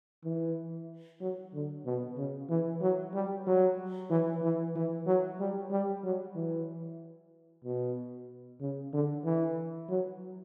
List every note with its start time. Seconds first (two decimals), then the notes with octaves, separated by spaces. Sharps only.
0.24 E3
1.21 F#3
1.53 D3
1.85 B2
2.17 C#3
2.50 E3
2.81 F#3
3.14 G3
3.47 F#3
4.10 E3
4.42 E3
4.75 E3
5.06 F#3
5.40 G3
5.71 G3
6.04 F#3
6.35 E3
7.64 B2
8.61 C#3
8.93 D3
9.25 E3
9.89 F#3